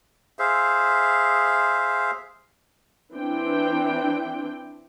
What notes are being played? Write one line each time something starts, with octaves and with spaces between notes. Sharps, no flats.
G#4 C5 E5 F5
E3 C4 D4 G5